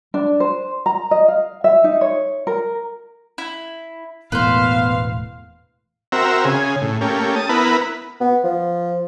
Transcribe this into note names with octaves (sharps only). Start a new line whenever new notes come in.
D4
C5
A#5
D#5
F5
E5
D#4
C#5
A#4
E4
E1 A2 A#3 B3 B4 C5 F5
C4 F#4 A#4 E5
C#3 G#4
A2
A3 A#3 C#4 G4
A5 D#6
B3 E4 A#4 B4
B3
F3